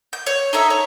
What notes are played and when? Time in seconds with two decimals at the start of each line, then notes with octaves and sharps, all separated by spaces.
0.13 G6
0.26 C#5
0.53 D#4 A4 C#5 E5
0.70 C#5